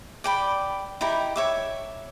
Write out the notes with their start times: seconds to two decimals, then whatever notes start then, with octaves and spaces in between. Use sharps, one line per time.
0.24 D5 G5 B5
1.01 D#4 E4 G4 G5
1.36 C#5 E5 D6